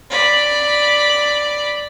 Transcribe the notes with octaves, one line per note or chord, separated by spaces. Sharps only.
D5 B5